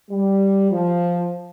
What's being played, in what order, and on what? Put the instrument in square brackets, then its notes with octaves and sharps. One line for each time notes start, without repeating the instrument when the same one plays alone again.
[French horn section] G3
F3